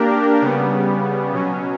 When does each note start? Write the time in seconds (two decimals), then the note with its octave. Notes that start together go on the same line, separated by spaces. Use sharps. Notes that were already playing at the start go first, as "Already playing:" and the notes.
Already playing: A#3 D4 G4 A#4
0.42 C#3 G3 B3
1.32 B2 F#3 C#4